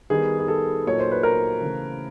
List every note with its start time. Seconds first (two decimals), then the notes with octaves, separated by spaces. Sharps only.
0.10 D#3 G3 B3 G#4
0.39 G#4
0.48 A4
0.86 A#2 F#3 A#3 D#4 C#5
1.00 C5
1.12 B4
1.23 A#4
1.60 C#3 E3 A3